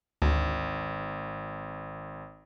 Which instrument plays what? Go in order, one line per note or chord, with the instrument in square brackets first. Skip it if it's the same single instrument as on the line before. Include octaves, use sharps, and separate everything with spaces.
[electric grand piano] G#1 [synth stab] D2